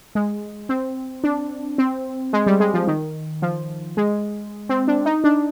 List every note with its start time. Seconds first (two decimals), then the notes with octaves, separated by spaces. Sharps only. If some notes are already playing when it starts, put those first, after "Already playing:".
0.15 G#3
0.69 C4
1.24 D4
1.78 C4
2.33 G#3
2.47 G3
2.60 G#3
2.74 F3
2.87 D#3
3.42 F3
3.97 G#3
4.69 C4
4.88 D4
5.05 D#4
5.24 D4